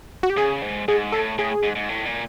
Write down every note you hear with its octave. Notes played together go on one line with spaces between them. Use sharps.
F#4
G4
C#3 G#4
G#2
G#2 G#4
A2 A4
A2 G#4
G#2
G#2
A2
A#2